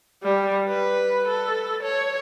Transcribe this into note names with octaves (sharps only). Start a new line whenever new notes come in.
G3
B4
A4
C#5